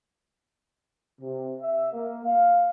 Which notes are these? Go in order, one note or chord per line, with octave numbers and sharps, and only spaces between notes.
C3
E5
A#3
F5